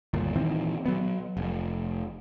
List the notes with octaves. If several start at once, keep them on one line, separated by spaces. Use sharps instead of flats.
G1 D#2 A#2
A#2 D#3 E3 C4
F#3 B3
F1